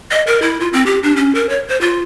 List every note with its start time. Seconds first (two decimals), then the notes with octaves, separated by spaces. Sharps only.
0.12 D#5
0.27 A#4
0.42 E4
0.61 F4
0.73 C4
0.86 G4
1.03 D4
1.16 C#4
1.35 A#4
1.49 C#5
1.68 C5
1.81 F4